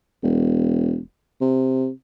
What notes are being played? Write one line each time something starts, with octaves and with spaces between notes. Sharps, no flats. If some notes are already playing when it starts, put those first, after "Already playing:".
E1
C3